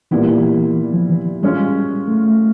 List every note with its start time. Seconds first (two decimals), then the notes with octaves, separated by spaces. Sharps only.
0.11 A#2 E3 G3 B3 E4
0.94 F3
1.09 E3
1.43 G3 G#3 C#4 F4
2.08 A3